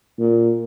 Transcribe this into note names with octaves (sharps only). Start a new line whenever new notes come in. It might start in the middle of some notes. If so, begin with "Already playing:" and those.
A#2